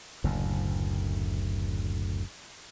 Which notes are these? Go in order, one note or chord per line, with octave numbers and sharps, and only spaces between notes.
F#1 D2 A2